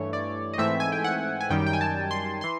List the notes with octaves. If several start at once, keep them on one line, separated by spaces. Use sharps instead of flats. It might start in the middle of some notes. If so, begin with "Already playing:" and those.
Already playing: G2 E3 A3 C#5
D5
D#5
G#2 E3 A3 C4 E5
G#5
G5
F#5
G#5
F#2 D#3 G3 G5
G5
G#5
A5
C6
E3 C6